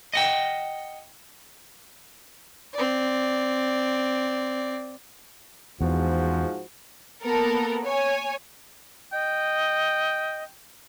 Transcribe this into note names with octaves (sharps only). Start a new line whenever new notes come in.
D#5 F#5 G5
C4 D5
E2 G#2 F3 F#4
A#3 B3 A4 A#4
C#5 G#5
D#5 G5